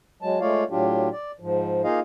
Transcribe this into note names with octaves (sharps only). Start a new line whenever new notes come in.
F#3 G#3 A5
G#3 A3 F4 C#5 D5 F5
A2 F#3 D4 F4 G4
D5
G#2 F3
A#3 D#4 F4 G#4 D#5 F5